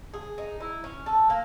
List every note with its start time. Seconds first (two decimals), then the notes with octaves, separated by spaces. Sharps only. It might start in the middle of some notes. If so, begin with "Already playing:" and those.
0.14 G#4
0.38 D#4
0.60 E4
0.84 C#4
1.06 A4
1.30 A#3